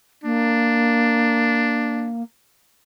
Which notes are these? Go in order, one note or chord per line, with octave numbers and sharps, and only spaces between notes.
A#3 D4